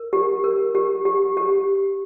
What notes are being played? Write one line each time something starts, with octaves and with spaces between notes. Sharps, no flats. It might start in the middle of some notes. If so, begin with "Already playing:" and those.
Already playing: A#4
G4
A#4
G4
G4
G4